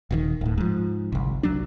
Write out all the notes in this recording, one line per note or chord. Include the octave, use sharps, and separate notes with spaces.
D#1 A#2 D#3
D1 A2
G#2 F3
G1 C2
C2 F#3 D4